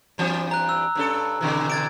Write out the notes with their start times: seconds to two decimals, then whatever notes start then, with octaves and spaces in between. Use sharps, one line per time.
0.18 G2 E3 C4
0.51 A#5 F#6
0.69 E6
0.95 G2 C#4 A4
1.41 B2 D3 E3
1.70 G#6 A6 D7